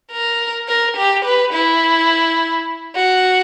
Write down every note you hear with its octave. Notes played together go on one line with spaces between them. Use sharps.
A#4
A#4
G4
B4
E4
F#4